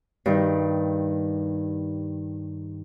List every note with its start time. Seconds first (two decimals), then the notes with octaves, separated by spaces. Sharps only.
0.26 G2 D#3